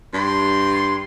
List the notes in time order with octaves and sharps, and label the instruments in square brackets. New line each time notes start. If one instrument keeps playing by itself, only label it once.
[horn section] G2 C6